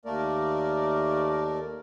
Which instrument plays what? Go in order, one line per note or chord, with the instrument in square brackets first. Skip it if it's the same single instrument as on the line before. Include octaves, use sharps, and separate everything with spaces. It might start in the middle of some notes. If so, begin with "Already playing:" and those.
[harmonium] D#2 A3 A#3 A#4 D5